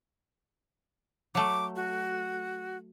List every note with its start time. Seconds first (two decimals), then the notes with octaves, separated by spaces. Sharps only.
1.35 F#3 A3 D6
1.76 F#4